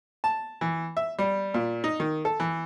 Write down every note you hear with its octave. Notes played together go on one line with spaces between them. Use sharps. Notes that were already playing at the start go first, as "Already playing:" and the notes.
A5
E3
E5
G3
A#2
D#4
D#3
A4
E3